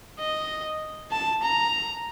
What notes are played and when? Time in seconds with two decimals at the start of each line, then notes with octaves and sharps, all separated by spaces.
0.19 D#5
1.12 A5
1.44 A#5